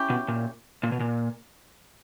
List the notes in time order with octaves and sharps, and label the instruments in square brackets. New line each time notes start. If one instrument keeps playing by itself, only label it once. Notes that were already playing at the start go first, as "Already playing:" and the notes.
Already playing: [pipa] C#4 E4 G4
[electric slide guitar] B2
A#2
A#2
B2
A#2